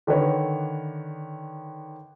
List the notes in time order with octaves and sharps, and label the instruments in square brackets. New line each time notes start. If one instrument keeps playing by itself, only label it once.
[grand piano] D3 D#3 D4 B4 C#5